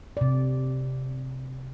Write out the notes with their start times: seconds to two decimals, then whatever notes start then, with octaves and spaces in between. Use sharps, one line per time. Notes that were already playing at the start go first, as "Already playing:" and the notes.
0.17 C3 D5